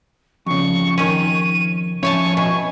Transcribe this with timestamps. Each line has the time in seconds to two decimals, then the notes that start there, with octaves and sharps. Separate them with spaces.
0.46 F2 C#3 C#6
0.98 D#3 C#4 D#7
2.03 F2 C#4 E4 C#5 G#5 A5 C#6
2.37 B2 G#5